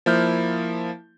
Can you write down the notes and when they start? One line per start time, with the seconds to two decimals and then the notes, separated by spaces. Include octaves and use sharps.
0.06 F3 A#3 E4 F6 G6